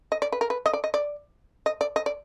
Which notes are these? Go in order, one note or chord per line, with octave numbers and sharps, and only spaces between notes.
D#5
D5
B4
A#4
B4
D#5
D5
D#5
D5
D#5
D5
D#5
D5